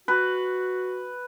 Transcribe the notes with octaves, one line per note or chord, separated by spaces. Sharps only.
F#4 B4